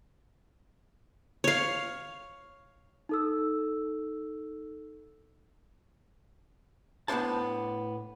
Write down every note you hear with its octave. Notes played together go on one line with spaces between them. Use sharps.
C#5 F5
D#4 A4 E6
A2 B3 D4 C5 A5